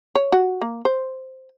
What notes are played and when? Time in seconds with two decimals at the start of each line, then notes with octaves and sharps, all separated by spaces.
0.15 C#5
0.32 F#4
0.61 A#3
0.85 C5